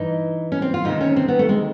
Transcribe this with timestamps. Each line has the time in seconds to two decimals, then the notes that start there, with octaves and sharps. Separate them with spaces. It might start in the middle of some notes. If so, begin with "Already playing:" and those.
Already playing: G2 E3 D#4
0.52 C#4
0.62 C4
0.74 F4
0.84 D2 C3 D#3 D#4
1.01 C#4
1.16 C4
1.28 B3
1.39 A3
1.49 G#3